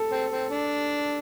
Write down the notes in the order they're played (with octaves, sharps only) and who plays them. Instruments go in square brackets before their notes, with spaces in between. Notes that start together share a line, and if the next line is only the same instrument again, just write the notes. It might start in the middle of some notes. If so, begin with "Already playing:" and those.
Already playing: [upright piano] A4
[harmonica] C4
C4
D4